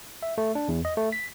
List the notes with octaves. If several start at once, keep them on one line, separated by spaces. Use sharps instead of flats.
E5
A3
D4
E2
D#5
A3
B6